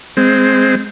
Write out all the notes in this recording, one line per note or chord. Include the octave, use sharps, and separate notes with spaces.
G#3 C4